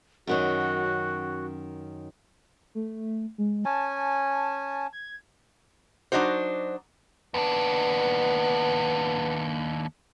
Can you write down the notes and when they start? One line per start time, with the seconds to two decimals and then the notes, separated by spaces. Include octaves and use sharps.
0.27 F#2 D#3 C#4 F#4
2.75 A3
3.38 G#3
3.65 C#4 G#5 A5
4.93 G#6
6.12 F#3 D4 D#4 F#4 C5
7.34 D#2 B3 D4